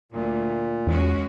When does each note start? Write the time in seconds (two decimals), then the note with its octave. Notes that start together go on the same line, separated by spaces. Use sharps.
0.12 D2 A#2
0.87 E2 G#3 C#4 F#4